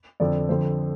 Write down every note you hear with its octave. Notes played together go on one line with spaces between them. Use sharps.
F2 D3 D5
F2 D3 C5